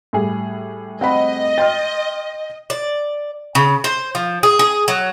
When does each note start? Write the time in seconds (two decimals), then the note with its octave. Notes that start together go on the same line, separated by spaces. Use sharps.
0.13 A2 G3 G#4
1.01 C4 D#5 F#5 B5
1.58 G5 C6 F6 A6
2.70 D5
3.55 C#3
3.84 C5
4.15 F3
4.43 G#4
4.59 G#4
4.88 F#3